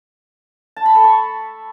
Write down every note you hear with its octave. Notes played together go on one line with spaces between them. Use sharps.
A5
B5
A4
C#6